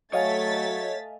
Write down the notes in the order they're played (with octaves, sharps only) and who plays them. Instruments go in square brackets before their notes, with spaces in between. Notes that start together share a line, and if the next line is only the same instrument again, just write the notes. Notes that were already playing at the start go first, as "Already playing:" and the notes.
[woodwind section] F#3 [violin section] A3 A6 B6 [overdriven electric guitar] C#5 [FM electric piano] D#5 F5 G#5